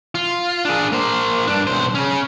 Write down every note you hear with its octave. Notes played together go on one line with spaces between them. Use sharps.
F4
D4 G#4
A#3 C5
G2 D4
B1 C5
C#3 C#4